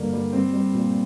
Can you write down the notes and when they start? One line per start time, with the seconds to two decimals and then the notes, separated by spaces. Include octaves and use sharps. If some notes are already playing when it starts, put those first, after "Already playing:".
Already playing: G2 D3 A#3
0.13 G3
0.33 G3 C4
0.53 G3
0.74 A#2